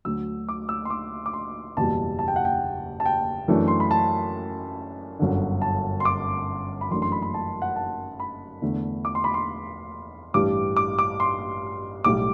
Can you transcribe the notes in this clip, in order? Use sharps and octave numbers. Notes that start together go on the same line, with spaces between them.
D2 D3 F#3 E6
D6
E6
C6
D6
D6
C6
F#1 E2 B2 G3 A5
A5
G5
F#5
G5
A5
G5
F#2 E3 A3 D4
C6
B5
A5
G1 F#2 D3
A5
C6
D6
B5
F#2 E3 A3 D4 C6
C6
B5
B5
A5
F#5
A5
B5
E2 D3 A3
D6
C6
B5
C6
A1 G2 E3 G3 D6
D6
D6
C6
B1 A2 G3 D6